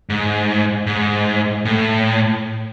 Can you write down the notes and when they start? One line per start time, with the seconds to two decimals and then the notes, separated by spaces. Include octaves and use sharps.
0.09 G#2
0.87 G#2
1.65 A2